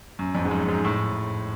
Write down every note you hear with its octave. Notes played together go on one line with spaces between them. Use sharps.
F#2
F2
G#2
F#2
G#2
A2